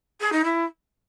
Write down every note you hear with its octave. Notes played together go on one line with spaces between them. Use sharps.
G#4
D#4
E4